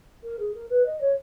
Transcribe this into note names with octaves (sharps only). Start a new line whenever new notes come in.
A#4
G#4
A#4
B4
D#5
C#5